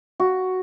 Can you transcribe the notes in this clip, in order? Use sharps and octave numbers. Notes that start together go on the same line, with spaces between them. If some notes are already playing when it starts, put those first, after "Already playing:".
F#4